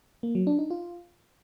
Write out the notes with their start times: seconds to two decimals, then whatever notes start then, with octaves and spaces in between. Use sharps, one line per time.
0.23 A#3
0.35 F#3
0.47 D4
0.59 D#4
0.70 F4